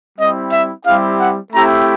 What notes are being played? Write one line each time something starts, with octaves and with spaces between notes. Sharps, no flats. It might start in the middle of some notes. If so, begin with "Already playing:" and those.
G3 C4 E4 D#5
E5
G3 C4 E4 G4 F5
F#5
A3 C4 E4 G4 A#5